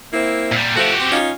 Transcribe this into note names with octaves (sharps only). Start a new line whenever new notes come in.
A#3 C4 E4
A#2 G3
F3 A3 F#4 G4
C4
C#4 D#4 F4